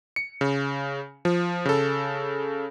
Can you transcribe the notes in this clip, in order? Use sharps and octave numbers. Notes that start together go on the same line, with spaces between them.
C#7
C#3
F3
C#3 A4